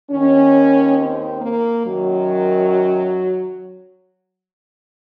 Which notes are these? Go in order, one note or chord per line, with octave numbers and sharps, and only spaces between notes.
D#2 D#3 C#4
C4
A#3
F#2 D#3 F#3